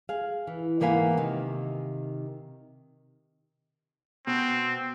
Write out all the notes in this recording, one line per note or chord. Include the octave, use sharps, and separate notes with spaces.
G#4 F5
E3
G#2 E3 A#3 B3 F5 G#5
C3 D#3
B2 C4